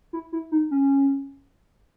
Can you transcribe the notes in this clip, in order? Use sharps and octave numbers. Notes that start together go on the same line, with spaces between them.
E4
E4
D#4
C#4